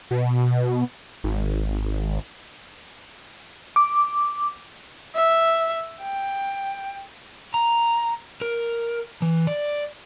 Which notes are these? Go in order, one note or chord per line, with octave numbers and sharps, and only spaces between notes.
B2
G#1
D6
E5
G5
A#5
A#4
E3
D5